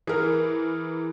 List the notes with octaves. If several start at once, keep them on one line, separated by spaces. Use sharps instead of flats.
E3 G#4 A#4